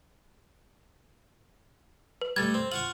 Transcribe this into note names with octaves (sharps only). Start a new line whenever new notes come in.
B4
G3 A3 G#6 A6
C4
F4 F#5 C#6 F#7